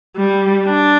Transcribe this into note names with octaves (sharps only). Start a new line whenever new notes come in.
G3
D4